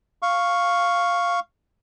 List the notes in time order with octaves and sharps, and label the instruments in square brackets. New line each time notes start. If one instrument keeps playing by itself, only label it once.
[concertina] F5 C#6